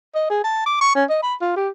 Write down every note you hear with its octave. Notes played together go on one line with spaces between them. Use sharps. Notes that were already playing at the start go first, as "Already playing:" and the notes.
D#5
G#4
A5
D6
C#6
C#4
D#5
B5
F4
G4